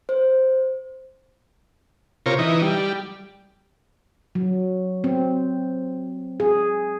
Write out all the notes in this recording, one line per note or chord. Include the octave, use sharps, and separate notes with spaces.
C5
C3 F4 A#4 C#5
E3 D#4
G3
F#3
C4
G#4